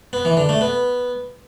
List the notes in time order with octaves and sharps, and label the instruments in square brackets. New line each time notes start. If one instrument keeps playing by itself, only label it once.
[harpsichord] B3
E3
D3
A3
B3